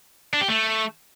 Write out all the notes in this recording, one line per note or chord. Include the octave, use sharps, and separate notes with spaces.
D4
G4
A3